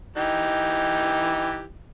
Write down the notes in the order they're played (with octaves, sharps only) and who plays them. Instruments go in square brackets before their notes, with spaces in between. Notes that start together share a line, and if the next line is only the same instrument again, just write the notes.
[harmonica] E3 D#4 G4